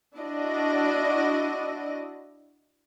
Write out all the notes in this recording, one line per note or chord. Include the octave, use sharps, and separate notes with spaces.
D4 E4 F#4 D5 D#5